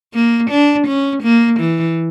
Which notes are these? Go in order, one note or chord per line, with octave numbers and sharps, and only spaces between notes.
A#3
D4
C#4
A#3
E3